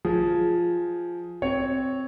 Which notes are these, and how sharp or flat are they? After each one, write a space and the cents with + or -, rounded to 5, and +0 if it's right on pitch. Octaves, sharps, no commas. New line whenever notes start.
F3 +0 G#4 +0
C4 +0 C#5 +0